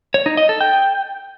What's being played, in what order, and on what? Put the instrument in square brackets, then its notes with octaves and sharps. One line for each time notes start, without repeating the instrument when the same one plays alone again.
[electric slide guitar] C#5
D#4
D#5
A4
G5